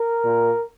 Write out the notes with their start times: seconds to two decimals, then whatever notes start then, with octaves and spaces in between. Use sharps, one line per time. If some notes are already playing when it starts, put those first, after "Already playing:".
Already playing: A#4
0.25 A#2